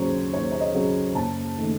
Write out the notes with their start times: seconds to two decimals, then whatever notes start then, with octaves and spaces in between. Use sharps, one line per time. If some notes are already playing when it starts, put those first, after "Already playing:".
Already playing: D#2 C#3 F#3 C5 C#5
0.33 D#2 C#5
0.52 C#5
0.61 D#5
0.75 C#3 F#3
1.15 F#1 A5
1.58 D#3 A3